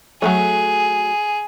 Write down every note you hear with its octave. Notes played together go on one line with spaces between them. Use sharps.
F#3 G#3 A3 G#4